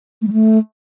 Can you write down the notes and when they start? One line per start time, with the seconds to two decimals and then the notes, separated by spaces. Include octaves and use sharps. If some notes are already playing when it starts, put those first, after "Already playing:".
0.22 A3
0.27 G3
0.33 A3